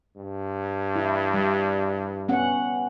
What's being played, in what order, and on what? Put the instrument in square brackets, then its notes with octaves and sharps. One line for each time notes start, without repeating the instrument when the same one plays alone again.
[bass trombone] G2
[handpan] E4
G3
B3 C#4 F#5